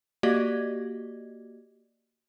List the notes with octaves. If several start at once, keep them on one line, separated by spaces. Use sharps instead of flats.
A#3 F#4 G4 D5 D#5 G#6